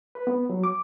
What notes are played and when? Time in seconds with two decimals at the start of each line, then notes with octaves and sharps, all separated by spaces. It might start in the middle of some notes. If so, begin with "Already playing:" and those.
0.15 B4
0.27 B3
0.50 F#3
0.64 D6